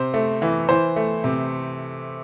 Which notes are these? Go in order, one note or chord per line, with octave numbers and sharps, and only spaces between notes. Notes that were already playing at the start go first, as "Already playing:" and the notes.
Already playing: C3 C5
A3
E3
E3 C5
A3
C3